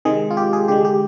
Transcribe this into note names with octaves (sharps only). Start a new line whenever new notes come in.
C3 D#3 G#3 G#4
F4
G4
G#4
D3 G#3 G4
G4